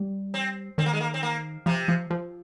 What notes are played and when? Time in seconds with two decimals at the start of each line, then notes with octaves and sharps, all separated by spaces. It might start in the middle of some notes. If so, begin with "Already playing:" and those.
Already playing: G3
0.34 C4
0.78 D#3 C4
0.86 A#3
0.93 G#3
1.01 A#3
1.14 C4
1.23 A#3
1.66 C3 F3
1.88 F3
2.10 F3